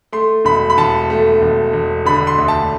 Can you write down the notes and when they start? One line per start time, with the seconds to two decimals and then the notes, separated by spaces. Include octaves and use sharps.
0.13 A3 C6
0.45 E1 B5
0.70 B5
0.78 E1 A5
1.10 A3
1.42 E1
1.73 E1
2.06 D3 B5
2.27 C6
2.38 D2
2.48 A5